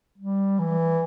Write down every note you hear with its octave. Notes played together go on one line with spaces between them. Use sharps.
G3
E3